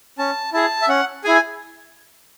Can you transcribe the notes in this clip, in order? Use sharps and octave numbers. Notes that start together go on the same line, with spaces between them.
C#4 A5
E4 G#4 A5
E5
C#4 F#5
E4 G#4 G#5